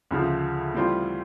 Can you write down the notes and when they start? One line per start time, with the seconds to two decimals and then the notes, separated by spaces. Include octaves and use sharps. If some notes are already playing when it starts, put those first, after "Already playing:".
0.11 D2 C#3 F3
0.74 A2 E3 G3 C4 F4